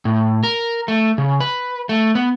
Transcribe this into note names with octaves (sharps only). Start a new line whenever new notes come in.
A2
A#4
A3
C#3
B4
A3
B3